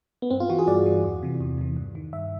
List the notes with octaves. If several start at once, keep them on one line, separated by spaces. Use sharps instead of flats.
B3
G2 C4
F4
E3 F#4
G#4
G2 D5
E3
E2
C3 E3
E2
C3 E3
G2
D#3
G2 E5